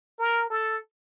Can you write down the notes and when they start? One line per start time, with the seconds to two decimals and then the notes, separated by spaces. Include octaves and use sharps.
0.19 A#4
0.50 A4